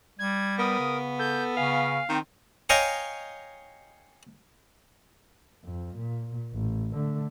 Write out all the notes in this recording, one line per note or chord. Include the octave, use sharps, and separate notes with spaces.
G3 G#6
B3 A#4 D#6
C#3
A4 G6
C#3 F5 G#5
D#3 C4
C#5 D#5 F5 G5 G#5 A#5
F2
A#2
A1
D3 A3